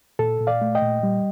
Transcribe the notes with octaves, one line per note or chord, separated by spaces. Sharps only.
A#2 A4
A#2
D5 F5
A3
D#5 G5
A#2
G3